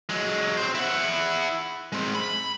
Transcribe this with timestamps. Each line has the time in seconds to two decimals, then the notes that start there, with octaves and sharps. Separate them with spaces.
0.09 F#3 G#3
0.57 C4 C5
0.75 E4 F#5
1.92 G#3 C4
2.15 B5